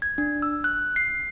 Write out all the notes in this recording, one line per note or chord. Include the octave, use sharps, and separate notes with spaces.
G#6
D4
E6
F#6
C7